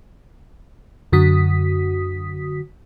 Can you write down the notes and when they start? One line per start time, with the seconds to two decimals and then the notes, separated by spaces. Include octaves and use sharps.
1.12 F#2 D3 F#4 D#6 B6